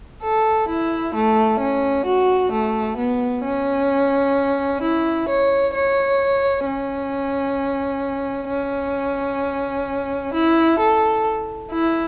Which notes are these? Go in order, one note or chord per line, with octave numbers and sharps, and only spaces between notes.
A4
E4
A3
C#4
F#4
A3
B3
C#4
E4
C#5
C#5
C#4
C#4
E4
A4
E4